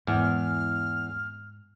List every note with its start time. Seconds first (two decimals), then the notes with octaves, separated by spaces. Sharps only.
0.07 E2 G#2 F6